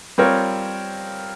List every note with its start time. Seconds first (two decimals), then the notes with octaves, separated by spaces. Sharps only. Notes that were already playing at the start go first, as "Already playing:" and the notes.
0.18 G3 C4 F4 A#4 C#5